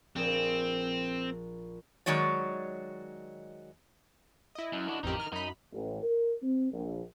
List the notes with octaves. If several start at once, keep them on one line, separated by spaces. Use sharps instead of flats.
A#1 C4 G#4
D#3 F#3 G#3 C#5 D5
E4 D#5
F#2
D4 F#4
A1 F2 D#4 G4 A#4
F6
F#2 D#4 B5
A1
A#4
C4
A#1